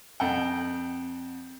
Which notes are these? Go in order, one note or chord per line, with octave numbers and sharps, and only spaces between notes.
F2 F#5 G5